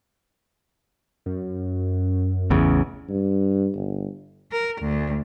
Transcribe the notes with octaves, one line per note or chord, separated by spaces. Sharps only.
F#2
A1 E2 C#3
G2
G1
A#4
D2